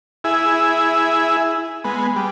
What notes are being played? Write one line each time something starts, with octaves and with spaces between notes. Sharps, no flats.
E4 G#4
G#3 B3
G3